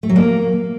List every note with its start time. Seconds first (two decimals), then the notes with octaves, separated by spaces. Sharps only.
0.03 A3
0.09 F#3
0.16 A#3